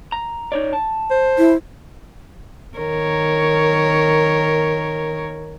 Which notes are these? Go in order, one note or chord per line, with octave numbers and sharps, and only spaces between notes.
A#5
D#4 C#5 D5
A5
C5
E4
D#3 A#4 C#5